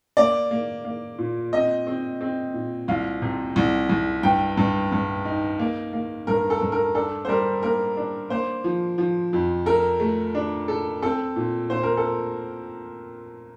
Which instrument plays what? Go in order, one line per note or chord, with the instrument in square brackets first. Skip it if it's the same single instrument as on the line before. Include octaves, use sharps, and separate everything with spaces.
[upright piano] A#3 [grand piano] D5
[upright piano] A#3
A#3
A#2
[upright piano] C4 [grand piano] D#5
[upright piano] C4
C4
A#2
[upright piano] C2 [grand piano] F5
[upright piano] C3
C2
C2
[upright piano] G2 [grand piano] G5
[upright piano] G2
G2
D#4
A#3
A#3
[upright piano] G2 [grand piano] A#4
[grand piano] A4
[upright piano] G2
[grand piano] A#4
[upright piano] D4 [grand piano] A4
[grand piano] C5
[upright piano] G3 [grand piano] A#4
[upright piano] A#3 [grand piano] A#4
[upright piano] D4
[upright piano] A#3 [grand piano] C5
[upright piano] F3
F3
F2
[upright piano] A4 [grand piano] A#4
[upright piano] A3
D4
A4
[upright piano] C4 [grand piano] A4
[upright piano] A#2
[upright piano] A#2 [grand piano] C5
[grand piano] A#4
A4